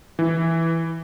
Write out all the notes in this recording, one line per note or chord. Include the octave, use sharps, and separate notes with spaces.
E3